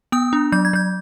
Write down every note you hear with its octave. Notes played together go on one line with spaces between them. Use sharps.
B3 D#6
D4
F#3 G6
G#6
F#3 G6